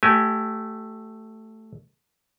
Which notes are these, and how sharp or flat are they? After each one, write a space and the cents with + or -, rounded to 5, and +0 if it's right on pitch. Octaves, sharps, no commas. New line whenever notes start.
A3 +0 G4 -25 G#5 +0